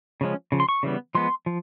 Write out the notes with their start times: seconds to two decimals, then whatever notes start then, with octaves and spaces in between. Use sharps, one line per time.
0.21 C#3 F3 G#3 C#4
0.52 C#3 F3
0.60 C6
0.69 C#6
0.83 C#3 E3 G3 B3
1.15 F3 G#3 B3 C6
1.46 F3